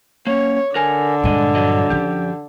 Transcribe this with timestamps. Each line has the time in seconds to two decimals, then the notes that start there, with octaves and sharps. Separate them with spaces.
0.27 A#3 C#4 C#5
0.76 D3 A#4 G#5
1.23 G2 A#2 G#3 D#5
1.55 F3 F#3 D#5
1.90 F#2 F3 G4